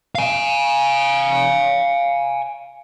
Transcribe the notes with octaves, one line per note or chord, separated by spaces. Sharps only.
F5 G#5